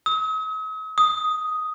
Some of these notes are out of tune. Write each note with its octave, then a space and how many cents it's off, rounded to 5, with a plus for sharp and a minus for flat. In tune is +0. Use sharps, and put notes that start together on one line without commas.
D#6 +45
D#6 +5